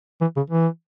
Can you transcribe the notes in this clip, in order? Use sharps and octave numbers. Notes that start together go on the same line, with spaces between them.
E3
C#3
E3